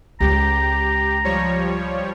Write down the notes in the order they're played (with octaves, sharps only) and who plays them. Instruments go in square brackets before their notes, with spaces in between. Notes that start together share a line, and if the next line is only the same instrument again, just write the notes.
[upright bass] C#2 G#3 [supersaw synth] G4 [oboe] A#5
[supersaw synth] F3 G3 C#5